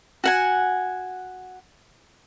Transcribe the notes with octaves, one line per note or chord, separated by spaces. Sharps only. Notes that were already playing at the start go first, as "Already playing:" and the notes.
F#4 F#5 G#5